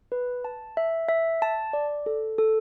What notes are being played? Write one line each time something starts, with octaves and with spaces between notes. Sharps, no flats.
B4
A5
E5
E5
A5
D5
A4
A4